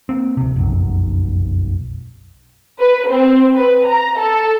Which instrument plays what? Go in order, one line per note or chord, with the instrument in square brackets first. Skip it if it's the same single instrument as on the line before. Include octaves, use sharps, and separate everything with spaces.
[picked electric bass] A#3 C4
D1 C3
F1 B1 F#2
[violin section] B4
C4
B4
A#5
A4